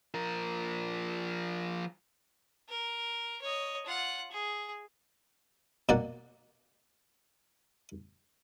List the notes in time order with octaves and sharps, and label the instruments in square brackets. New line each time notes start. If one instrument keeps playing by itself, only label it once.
[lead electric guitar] F3 A#4
[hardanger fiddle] A#4
C#5 D#5
F4 F#5
G#4
[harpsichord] B2 A#3 D5 F#5